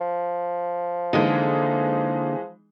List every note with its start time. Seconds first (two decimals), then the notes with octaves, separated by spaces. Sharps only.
0.01 F3
1.13 D3 E3 G#3 A#3 D#4